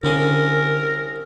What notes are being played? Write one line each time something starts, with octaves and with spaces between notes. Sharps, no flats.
C2 D3 C#4 G#4 A#4